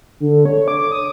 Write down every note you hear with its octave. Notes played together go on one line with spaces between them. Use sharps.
D3
C#5
D6
D#6